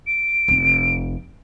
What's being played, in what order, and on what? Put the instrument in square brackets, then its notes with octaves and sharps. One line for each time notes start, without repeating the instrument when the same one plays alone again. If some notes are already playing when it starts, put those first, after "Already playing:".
[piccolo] D7
[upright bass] F1 C4